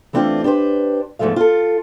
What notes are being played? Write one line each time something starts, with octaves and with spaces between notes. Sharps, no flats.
E3 A3 C4 D4 F4
D4 G4 B4 C5
E2 G#2 C#3 F3 A3 F5
F4 A4